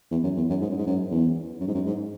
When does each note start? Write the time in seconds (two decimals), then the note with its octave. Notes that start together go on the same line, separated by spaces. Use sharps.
0.11 E2
0.23 F#2
0.37 E2
0.49 F#2
0.61 G#2
0.70 F#2
0.78 G#2
0.87 F#2
1.11 E2
1.60 F#2
1.67 G#2
1.75 F#2
1.86 G#2